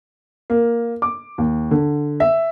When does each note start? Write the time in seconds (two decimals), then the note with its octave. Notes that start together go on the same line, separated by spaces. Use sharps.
0.50 A#3
1.02 D6
1.38 D#2
1.71 D3
2.20 E5